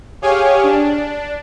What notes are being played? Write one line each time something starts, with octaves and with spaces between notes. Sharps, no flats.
G4 G#4 C#5 F5 G#5
D4